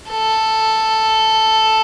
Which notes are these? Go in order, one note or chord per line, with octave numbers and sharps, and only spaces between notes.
A4